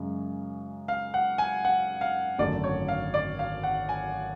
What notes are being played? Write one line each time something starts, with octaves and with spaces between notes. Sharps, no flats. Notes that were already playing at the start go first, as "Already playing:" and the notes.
Already playing: F#2 C#3 G#3
F5
F#5
G#5
F#5
F5
G#1 F#2 D3 F#3 A3 D5
C#5
F5
D5
F5
F#5
G#5